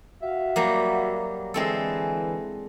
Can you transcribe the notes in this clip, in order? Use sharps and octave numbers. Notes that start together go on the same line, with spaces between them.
F#4 E5 F5
F#3 G3 A#3
D3 E3 G#3 C4 A4